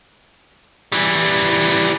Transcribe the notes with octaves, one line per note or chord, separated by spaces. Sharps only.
E3 G3